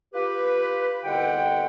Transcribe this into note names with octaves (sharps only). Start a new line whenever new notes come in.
F4 G4 B4
C2 B2 D3 F#5 G5